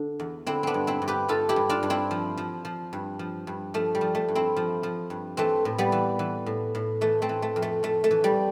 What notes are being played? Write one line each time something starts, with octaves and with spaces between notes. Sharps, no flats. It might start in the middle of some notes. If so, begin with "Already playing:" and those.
Already playing: D3 D4
E2
D3 C4 E4
B3 C4 D4
G2
C4 E4
G2
G4 B4
G2 F4 A4
E4 G4
G2
D4 F4
G2
C4 E4
F3
F3
F3
G2
F3
G2
F3 A3
G3
F3
A3
G2
C4 E4
F3
F3
G2
E3 A3 C4
A2
G3 B3
E3
E3
A2
A2
E3 A3
A3 C4
E3
A3
F2
A3
F2 A3
A3
E3
G3